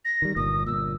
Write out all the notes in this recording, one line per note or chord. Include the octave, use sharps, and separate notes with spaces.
A#6
D#3 G3
G1 A#2 D#6
G1 A#2 E6